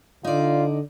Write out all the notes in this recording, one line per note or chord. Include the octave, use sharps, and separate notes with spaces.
D3 D#4 F4 D5